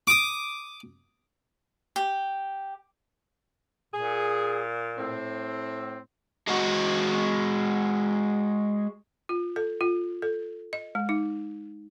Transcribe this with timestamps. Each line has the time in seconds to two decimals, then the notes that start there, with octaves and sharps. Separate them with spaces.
0.07 D6 D#6
1.96 G4
3.94 A#2 G#4
4.97 A2 C4
6.47 G#3 F#4
9.29 F4
9.56 A4
9.81 F4
10.22 A4
10.73 D#5
10.95 G#3
11.09 D#4